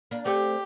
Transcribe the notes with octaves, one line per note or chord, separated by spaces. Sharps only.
A#3 D4
A3 C4 G4